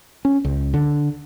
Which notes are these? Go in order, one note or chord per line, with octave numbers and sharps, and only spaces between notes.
C#4
C#2
D3